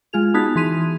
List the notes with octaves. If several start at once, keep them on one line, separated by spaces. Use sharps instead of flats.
G#3 F4 G#4 F7
B3 D#4 F#4 G#4 A5 B6
E3 G#4 C6 B6 D#7 F7